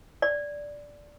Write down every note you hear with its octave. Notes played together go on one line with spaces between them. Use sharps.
D5